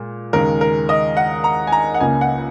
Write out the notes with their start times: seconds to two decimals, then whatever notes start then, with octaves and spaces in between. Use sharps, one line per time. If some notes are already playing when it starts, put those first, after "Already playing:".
Already playing: A#2 G#3
0.33 D#2 C#3 G#3 A#4
0.61 A#4
0.89 D#5
1.17 F#5
1.44 A#5
1.67 G#5
1.72 A#5
1.94 F#5
2.00 C#2 C#3 A#3 G#5
2.21 F#5